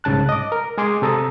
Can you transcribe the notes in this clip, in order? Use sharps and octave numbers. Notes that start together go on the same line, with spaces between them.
C2 G#2 C#3 A5 F#6
D#5 D6
A#4
G#3 G#4 C6 D6 D#6
C3 A4 A#5 D#6